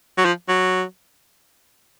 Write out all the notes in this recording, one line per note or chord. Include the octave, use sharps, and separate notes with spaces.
F#3
F3
F#3